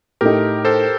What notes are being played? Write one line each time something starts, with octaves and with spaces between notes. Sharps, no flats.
A2 A3 D#4 G4 A#4
A4 C5